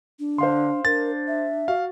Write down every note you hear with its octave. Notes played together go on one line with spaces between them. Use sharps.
D4
D3 C5 F5 C6
D4 A#4 A6
E5
F#4 F5